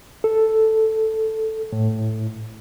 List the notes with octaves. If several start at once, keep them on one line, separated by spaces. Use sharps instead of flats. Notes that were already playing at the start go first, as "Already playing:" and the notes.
A4
A2